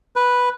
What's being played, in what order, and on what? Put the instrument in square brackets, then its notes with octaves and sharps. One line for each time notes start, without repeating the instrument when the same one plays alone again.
[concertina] B4